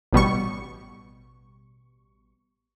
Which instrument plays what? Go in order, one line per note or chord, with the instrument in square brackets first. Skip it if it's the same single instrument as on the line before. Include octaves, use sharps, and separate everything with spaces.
[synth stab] A1 B2 G3 C#6